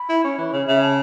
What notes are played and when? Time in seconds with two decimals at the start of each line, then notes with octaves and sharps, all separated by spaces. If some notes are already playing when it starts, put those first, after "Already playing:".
Already playing: B5
0.09 E4
0.24 C#4
0.38 E3
0.52 C#3 C#5
0.67 C#3 E5
0.82 A5